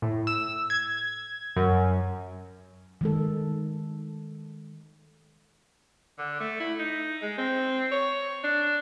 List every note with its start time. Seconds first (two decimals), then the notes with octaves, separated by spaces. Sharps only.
0.02 A2
0.27 E6
0.70 G#6
1.56 F#2
3.01 D#3 G#3 A4
6.18 D3
6.40 A3
6.60 E4
6.79 D#4
7.22 G#3
7.38 C4
7.92 C#5
8.44 D4